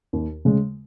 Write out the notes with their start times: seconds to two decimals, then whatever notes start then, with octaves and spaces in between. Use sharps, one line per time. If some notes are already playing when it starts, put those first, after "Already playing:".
0.13 D#2
0.45 C#3 G#3